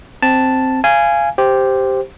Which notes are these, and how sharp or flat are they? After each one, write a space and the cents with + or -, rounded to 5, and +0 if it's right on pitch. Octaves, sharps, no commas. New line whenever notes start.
C4 +0 A5 +0
F5 -25 G#5 +0
G4 +0 C5 +0